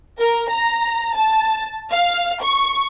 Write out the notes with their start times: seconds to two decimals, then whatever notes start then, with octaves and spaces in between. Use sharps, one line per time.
0.20 A#4
0.51 A#5
1.15 A5
1.91 F5
2.42 C#6